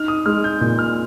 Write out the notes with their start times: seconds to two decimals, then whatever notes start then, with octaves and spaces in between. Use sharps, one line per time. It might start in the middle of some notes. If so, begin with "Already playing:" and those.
Already playing: D#4 F6
0.08 D#6
0.26 G#3 F6
0.44 G6
0.61 A#2 G6
0.79 F6